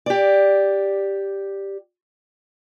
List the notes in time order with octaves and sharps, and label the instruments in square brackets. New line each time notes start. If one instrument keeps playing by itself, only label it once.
[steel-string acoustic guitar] G4 D5